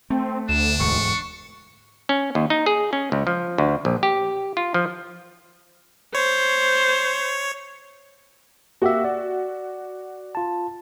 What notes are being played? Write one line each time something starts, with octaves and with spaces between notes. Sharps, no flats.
A3 C4
D2 D4 E7
E1 G#2 C#6
C#4
D#2
D#4
G#4
C#4
C#2
F3
D2
A#1
G4
F4
F3
C5 C#5
A#3 F#4 G4 E5
D5
F4 A5